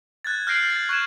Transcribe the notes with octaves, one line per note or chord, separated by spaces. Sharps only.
F#6 G#6 A6
F6 G6 A#6 C7 D7 F#7
A6
C#6 F#6 G#6 D7 E7